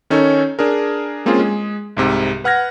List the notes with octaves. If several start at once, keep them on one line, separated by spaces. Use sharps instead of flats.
D#3 C#4 D#4 A4 C#5
D4 G#4 A#4
G#3 A#3 C4 C#4 F4 G#4
G#3 G#4
C2 G#2 C3
B4 F#5 F6 G#6 A#6